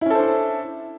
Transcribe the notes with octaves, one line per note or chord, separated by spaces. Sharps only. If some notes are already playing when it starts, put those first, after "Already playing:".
C#4 D4 E4 A4 C5